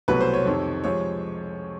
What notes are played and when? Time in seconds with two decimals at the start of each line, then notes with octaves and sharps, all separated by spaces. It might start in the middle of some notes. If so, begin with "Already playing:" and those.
0.08 C2 B2 F#3 A3 B4
0.21 C5
0.33 C#5
0.45 F2 C3 D#3
0.84 C3 F3 G#3 C#5